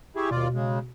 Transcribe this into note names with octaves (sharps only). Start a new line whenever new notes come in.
E4 G4 G#4 C#6
D#2 B2 F4 D5
C#3 G#3